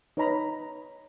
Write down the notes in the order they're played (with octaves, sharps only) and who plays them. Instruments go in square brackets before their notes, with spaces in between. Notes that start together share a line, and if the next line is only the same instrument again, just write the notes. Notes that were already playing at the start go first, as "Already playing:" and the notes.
[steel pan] D#4 B4 C#5 D#5 A#5 B5